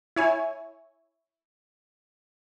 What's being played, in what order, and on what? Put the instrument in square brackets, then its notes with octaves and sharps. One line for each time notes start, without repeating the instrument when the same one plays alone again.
[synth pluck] E4 C#5 G#5